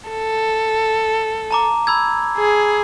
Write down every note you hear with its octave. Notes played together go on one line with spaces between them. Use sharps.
A4
A5 A#5 D6
B5 E6 G#6
G#4